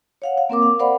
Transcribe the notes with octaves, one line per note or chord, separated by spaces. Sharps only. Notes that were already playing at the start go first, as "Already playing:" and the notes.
C#5 F5 F#5
F5
A#3 C4 A#4 D6
F5
A#4 C5 D5 F5 F#5 B5